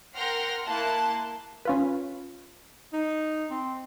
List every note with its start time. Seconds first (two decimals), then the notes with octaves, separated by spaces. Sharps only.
0.16 A#4 F#5 G5 C6 F6 A#6
0.66 A#3 E4 A5 C6 F#6
1.65 C#4 F4 B4
2.93 D#4
3.51 C4